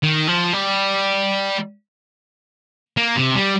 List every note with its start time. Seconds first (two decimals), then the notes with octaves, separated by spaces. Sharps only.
0.03 D#3
0.27 F3
0.53 G3
2.97 A#3
3.16 C3
3.35 G3